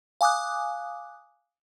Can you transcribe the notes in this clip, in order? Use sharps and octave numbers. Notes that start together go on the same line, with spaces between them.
F5 G#5 D6 D#6 F#6